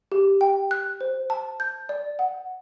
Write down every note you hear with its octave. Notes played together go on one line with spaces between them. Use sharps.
G4
G5
F#6
C5
A5
G6
D5
F#5